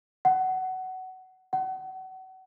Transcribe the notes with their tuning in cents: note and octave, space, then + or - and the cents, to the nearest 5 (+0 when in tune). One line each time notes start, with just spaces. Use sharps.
F#5 +15
F#5 +30